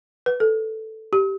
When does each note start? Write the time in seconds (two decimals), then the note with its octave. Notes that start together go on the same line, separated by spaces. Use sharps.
0.26 B4
0.40 A4
1.13 G4